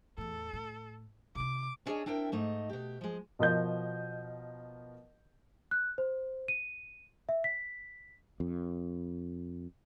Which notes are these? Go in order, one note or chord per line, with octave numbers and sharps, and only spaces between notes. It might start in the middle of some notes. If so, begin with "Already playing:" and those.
E2 A2 A4
A2
C3 D#3 D6
B3 C#4 D4 G#4 C#5 D#5
C4 D4 E4 A#4 G5
G#2 A3 D#4
B2 G4
F3 G#3
B2 F3 A#4 D#5 G6
F#6
C5
D#7
E5
B6
F2